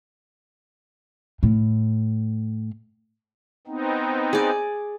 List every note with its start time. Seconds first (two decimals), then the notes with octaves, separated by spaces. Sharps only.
1.43 A2
3.67 B3 C4 D#4
4.33 G#4 D5